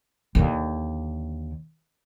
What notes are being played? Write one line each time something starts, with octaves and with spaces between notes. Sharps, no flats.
D#2 D3